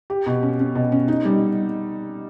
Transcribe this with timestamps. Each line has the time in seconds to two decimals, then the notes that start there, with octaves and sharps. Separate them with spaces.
0.10 G4
0.26 B2
0.42 C#4
0.60 C#4
0.75 B2
0.92 C#4
1.08 D#4
1.25 G3